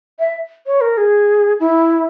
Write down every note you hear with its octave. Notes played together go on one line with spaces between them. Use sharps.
E5
C#5
A#4
G#4
E4